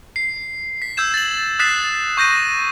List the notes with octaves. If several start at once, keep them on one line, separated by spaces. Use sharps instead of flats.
C7
B6
E6 G6 G#6 E7
A6 F#7
D#6 F#6 A6 B6 C7 E7
C#6 G6 A#6 D#7